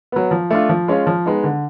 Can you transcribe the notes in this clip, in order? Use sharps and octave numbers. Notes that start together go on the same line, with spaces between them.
F#3 B3
F3
A3 D4 F4
F3
G#3 C#4 F4
F3
G#3 B3 D#4
D3